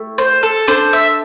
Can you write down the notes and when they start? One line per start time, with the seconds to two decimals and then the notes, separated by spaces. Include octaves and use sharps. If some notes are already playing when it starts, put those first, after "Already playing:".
Already playing: A3 E4 G4
0.18 C5
0.43 A4
0.67 D4 A4 C5
0.93 E5